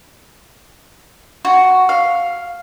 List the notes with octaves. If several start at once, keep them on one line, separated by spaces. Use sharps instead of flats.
F#4
F5